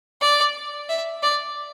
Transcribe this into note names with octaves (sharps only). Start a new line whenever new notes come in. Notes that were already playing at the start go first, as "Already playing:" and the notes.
D5
E5
D5